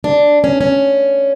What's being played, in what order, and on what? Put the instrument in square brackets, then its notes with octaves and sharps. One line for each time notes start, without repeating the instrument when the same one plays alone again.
[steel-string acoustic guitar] D4
C#4
C#4